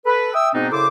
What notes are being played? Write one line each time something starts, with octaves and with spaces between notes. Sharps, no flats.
A4 B4
E5 G5 D#6 E6
G#2 B2 B3 C4 D4 D#4
F#2 C#3 E4 A4 C5 D6